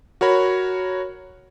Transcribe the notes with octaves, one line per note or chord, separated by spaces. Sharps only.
F#4 A#4 C#5 B5